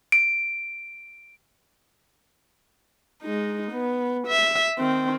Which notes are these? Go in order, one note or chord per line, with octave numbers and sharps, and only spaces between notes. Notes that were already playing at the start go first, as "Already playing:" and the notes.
D7
G#3 D#4
B3
E5
D#3 C4